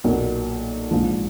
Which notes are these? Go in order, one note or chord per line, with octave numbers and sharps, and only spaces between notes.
B1 A#2 F#3 A#3
A#1 G#2 F3